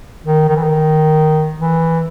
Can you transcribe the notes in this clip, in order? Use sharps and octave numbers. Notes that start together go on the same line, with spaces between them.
D#3
D#3
E3
D#3
E3